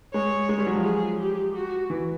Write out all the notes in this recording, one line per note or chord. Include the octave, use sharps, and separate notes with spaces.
G#3 C#5
G#3
G3
F#3
F3
G#4
G4
F#4
E3